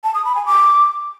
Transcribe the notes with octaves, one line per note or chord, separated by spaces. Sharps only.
A5
D#6
B5
G#5
D6